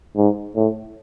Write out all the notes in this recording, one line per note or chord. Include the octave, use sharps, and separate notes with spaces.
G#2
A2